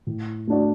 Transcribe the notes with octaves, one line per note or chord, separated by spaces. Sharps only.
A2
A3 D4 F#4 D5